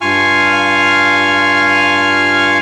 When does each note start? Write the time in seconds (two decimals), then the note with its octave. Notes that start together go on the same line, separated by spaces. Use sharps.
0.01 G2 F4 F5 G#5 C#6 F6